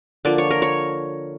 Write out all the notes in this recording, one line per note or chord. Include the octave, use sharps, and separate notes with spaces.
D3 F3 A#3 D5
C#5
A#4
C#5